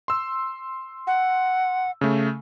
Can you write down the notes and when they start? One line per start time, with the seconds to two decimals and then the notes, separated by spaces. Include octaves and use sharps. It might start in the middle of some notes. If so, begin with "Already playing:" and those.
0.08 C6 E6
1.07 F#5
2.01 C#3 A3